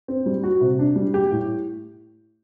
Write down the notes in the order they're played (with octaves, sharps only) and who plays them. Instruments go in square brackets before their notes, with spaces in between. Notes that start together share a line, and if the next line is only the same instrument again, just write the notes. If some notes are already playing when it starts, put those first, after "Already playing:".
[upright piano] C4
G3
F#4
C3
D4
G3
G4
A2